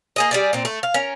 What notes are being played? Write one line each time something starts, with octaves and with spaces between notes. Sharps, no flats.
A#3 G#4 D#5
G3 G#4 D5
A#2 C4
A3
F5
C#4 A#4